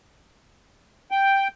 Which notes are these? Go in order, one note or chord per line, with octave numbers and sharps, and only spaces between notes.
G5